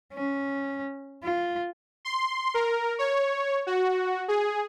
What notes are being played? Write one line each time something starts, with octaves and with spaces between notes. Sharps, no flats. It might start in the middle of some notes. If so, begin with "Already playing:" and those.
C#4
F4
C6
A#4
C#5
F#4
G#4